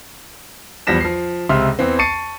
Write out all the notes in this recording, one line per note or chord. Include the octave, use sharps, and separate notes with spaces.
E2 F3 G3 A#6 B6 E7
F3 C7
C#2 C3 E5 C6 F6
E2 E3 C4
A5 C#6 A6 C7 C#7 D#7